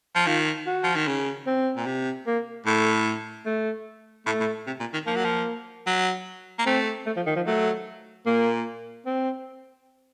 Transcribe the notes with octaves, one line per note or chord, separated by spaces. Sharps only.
F3
D#3 F4
F#4
F3
D#3
C#3
C4
A#2
C3
A#3
A2 A3
A3
A2 A3
A2
C3
A#2
D#3
F3 A#3
F#3
F3
F#3
A#3
A3 C4
A3
F3
D#3
F3
F#3 A3
A#2 A#3
C4